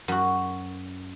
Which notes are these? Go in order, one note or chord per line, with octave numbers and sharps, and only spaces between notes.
F#2 F#4